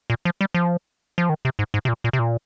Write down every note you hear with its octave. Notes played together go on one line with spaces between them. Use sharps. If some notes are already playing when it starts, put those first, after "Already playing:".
A#2
F3
G3
F3
F3
D#3
C3
G#2
G#2
C3
A#2
A#2
C3
A#2